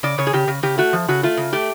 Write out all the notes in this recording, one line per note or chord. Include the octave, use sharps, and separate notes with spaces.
C#3 D5
C#3 C#5
G#4
C#3 G4
C#3
C#3 G4
A3 F#4
F3
C#3 F#4
A3 F4
C#3
A3 G4